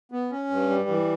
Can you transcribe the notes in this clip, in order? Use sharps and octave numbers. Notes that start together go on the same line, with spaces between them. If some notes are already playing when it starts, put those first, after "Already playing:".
B3
C#4
G2
G3
E3